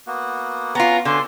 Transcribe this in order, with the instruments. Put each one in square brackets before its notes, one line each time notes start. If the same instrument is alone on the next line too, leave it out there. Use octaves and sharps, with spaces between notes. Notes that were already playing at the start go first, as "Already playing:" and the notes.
[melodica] A#3 B3 F#4
[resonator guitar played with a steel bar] B3 F4 [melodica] C#4 F#4 [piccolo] A#5
[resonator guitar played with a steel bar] D3 [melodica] C#4 F#4 C#5 [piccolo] C6